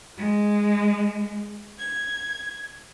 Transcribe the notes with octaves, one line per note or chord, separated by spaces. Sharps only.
G#3
G#6